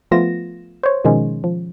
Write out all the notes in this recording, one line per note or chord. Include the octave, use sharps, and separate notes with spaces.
F3 A3 B3 F4 A#6 E7
C5 C#5
B2 D#3 F3 G#3 C#4
F3